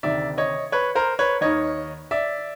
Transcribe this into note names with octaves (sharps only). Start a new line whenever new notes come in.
D2 C3 D#3 D5 E5
C#5 D#5
B4 C#5
A#4 C5
B4 C#5
D#2 D#3 C#5 D#5
D5 E5